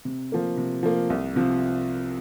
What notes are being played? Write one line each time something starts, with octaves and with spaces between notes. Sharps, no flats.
C3
F3 A#3
C3
F3 A#3
C2
C3 F3